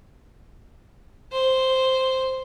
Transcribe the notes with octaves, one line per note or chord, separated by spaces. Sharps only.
C5